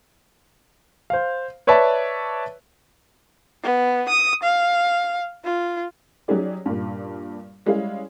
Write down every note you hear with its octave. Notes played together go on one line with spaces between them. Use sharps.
C5 F5
B4 C#5 D5 E5 A5
B3
D#6
F5
F4
F#3 C#4 D#4 G4 G#4 D5
G2 A#2
G3 G#3 C#4 E4 G#4 F5